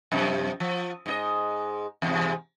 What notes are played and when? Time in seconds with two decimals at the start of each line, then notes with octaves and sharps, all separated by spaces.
0.12 F#2 C3 F3
0.60 F3
1.06 G#2 D#4 D#5
2.02 E2 G#2 C3